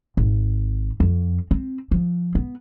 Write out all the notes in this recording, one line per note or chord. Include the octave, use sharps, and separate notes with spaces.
G#1
F2
C4
F3
B3